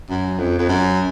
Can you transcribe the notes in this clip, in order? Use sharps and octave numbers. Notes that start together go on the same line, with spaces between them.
F#2
F2
F2
F#2